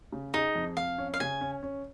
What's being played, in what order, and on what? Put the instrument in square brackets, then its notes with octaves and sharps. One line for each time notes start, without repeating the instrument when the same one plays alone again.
[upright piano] C#3
[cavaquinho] D#4 [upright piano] G#4
[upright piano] F2
[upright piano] F2 [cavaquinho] F5
[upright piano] C#4
[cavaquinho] F5
[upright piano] C#3 [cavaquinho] G#5
[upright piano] C#4
C#4